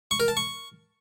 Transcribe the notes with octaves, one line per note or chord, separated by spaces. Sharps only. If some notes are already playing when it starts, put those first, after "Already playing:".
C#6
A#4
A5
C#6